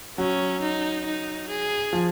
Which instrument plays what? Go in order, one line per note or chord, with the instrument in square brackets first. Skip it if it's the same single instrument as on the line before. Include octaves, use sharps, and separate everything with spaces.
[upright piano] F#3 [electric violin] C#4
[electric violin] D#4
D#4
G#4
[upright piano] F3